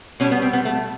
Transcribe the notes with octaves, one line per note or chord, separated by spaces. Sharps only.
B2 G3 C#4
B3
C4
B3
A3